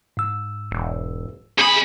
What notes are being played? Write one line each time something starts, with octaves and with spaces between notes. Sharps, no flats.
G#2 E6
E1
F#2 G#4 B5